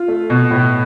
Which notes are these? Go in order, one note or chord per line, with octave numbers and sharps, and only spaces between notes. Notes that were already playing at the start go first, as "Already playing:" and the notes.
Already playing: F4
A3
B2
A2